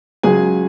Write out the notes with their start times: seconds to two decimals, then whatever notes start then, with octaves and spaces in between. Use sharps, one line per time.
0.23 C#2 C#3 F#3 G#4 G#5